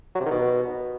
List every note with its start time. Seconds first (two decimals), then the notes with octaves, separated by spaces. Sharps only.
0.15 F#3
0.21 C3
0.26 D#3
0.31 B2